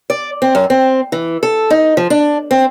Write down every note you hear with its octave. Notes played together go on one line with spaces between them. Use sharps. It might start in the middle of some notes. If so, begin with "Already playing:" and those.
D5
C4
F#2
C4
E3
A4
D#4
F3
D4
C4